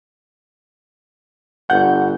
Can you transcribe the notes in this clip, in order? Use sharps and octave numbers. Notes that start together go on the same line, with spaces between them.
G1 F#5 G6